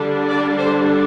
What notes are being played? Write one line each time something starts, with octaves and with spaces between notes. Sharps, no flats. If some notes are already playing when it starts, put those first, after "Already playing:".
Already playing: D3 G3 D4
D5
C5